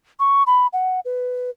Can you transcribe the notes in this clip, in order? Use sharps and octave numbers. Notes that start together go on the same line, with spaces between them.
C#6
B5
F#5
B4